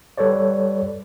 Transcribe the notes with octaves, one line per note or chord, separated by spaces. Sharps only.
G3 A4 B4 C#5 D5